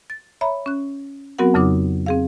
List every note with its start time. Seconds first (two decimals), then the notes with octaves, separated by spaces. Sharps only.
0.10 A6
0.41 C#5 E5 A#5 B5
0.66 C#4 F#6
1.38 F#3 B3 C4 F#4 A#4 F#5
1.54 F2 C#3 F#3 D#4 D6
2.06 C4 G#4 F5